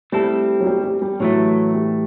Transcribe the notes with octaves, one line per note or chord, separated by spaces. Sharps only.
G3 A3 C4 E4 A4
F#3
G3
G3
G3
A2 E3 F#3 A3
G3